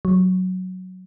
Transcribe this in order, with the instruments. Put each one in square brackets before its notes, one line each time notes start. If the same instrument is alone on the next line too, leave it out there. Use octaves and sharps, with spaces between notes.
[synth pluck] F#3